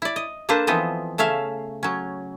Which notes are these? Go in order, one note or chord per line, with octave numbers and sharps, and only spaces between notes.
E4 D5
D#5
A#3 D4 A4 B4 C5
E3 F3 B3 C4 D#5
C#3 A3 C#4 E5 F5
F#3 C#4